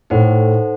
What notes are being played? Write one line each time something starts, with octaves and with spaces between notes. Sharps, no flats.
A2 D#4 A4 C5 F#5